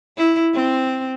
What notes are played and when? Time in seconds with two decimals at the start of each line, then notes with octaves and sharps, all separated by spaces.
0.17 E4
0.54 C4